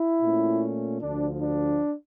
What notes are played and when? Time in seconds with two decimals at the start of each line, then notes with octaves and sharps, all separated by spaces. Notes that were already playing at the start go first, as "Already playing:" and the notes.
Already playing: E4
0.21 A#2 A3 C#4
1.00 D2 D3 F3 D4
1.40 D4